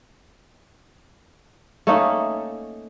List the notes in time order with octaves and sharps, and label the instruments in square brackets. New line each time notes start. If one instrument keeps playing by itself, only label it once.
[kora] A3 A#3 C#4 D#4